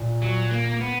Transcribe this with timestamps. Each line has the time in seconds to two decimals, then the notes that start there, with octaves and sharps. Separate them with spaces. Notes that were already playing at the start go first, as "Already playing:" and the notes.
Already playing: A#2
0.22 F#3
0.51 A#3
0.81 B3